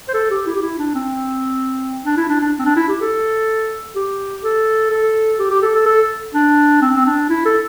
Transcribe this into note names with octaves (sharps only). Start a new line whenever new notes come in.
C5
A4
G4
E4
G4
E4
D4
C4
D4
E4
D4
D4
C4
D4
E4
G4
A4
G4
A4
A4
G4
G4
A4
A4
A4
D4
C4
C4
D4
E4
A4